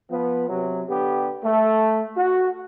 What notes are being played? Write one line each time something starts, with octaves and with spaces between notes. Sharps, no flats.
F3 B3
C3 F#3
D3 B3 G4
A3
F#4